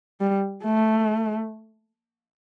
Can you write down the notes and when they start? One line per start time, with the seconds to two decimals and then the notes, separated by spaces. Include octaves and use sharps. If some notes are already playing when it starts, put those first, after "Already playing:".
0.21 G3
0.64 A3